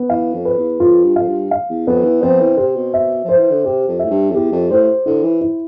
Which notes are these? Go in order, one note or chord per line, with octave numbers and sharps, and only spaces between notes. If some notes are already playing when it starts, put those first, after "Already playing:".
Already playing: B3
E3 F5
F2
B4
E2
F2 F4
G2
F2 F5
G2
F5
E2
F2 B3
E3
F3 C4
E3
C3 C5
B2
E5
F3 C5
E3
D3
C3 G4
F2
A2 E5
G2
F2
E2 G4
F2
A2 C5
D3 E4
E3
E4